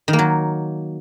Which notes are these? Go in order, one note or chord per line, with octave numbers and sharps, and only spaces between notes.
D#3
A#3
F#3